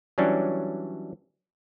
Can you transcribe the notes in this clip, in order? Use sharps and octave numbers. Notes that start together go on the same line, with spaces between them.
E3 F#3 G3 C#4 D4